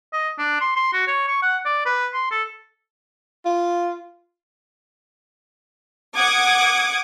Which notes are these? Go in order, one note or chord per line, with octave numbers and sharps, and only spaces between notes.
D#5
D4
C6
C6
F#4
C#5
C#6
F#5
D5
B4
C6
A4
F4
F#5 D6 D#6 G#6